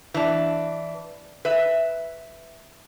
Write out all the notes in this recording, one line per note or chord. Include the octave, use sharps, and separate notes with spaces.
E3 D4
B4 E5